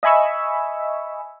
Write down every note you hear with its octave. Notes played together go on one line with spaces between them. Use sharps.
D#5 E5 G#5 B5 C#6 E6